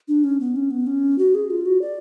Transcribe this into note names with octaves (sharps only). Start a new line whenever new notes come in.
D4
C#4
B3
C#4
B3
C#4
F#4
G#4
F4
F#4
D5